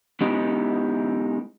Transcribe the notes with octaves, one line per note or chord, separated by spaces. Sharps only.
G#3 B3 D#4 E4 G4